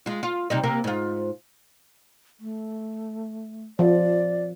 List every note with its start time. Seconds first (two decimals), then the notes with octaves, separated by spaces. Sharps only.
0.06 G#3 F4
0.23 F4
0.50 C3 G3 D#4
0.63 C3 A#3 A#4
0.84 G#2 F4
2.40 A3
3.79 F3 D5